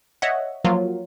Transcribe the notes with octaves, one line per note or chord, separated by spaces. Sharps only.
C#5 D#5 E5 F#5
F3 F#3 A#3 F4